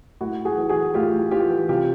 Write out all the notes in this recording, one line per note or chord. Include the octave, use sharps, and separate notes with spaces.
A2 E4 F#4
A2
F#4 G#4
E3
F#4 G#4
E3
A2 F4 G4
A2
E3 F4 G4
E3
C3 F4 G4